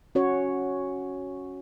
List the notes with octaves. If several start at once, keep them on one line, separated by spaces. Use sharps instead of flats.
C#4 F#4 C#5